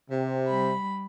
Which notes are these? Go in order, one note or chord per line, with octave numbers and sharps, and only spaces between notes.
C3
G3 B5